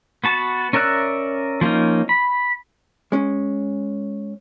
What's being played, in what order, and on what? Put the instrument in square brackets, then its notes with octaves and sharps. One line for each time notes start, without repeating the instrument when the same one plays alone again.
[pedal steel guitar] B3 F#4 A5
C#4 A#4 D5 E5 F#6
F3 A#3 C#4 D#4
B5
[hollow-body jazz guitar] G#3 C#4